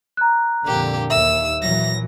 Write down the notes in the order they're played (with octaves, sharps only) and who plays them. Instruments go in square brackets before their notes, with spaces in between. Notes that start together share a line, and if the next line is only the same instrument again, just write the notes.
[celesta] A#5 F#6
[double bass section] F2 A#2 D3 [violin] A#3 G4
[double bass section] D#2 [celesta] E5 [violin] E6
[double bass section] A#2 E3 F#3 [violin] A#6